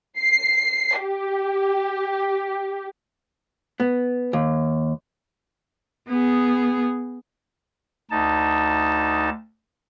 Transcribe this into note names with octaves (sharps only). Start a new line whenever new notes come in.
C7
G4
B3
D#2
B3 G#4
D2 D#4 A5